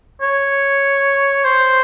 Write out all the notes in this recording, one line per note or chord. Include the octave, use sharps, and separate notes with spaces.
C#5
C5